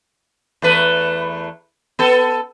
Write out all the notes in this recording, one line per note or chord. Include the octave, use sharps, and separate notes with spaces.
E2 A3 B4
B3 A4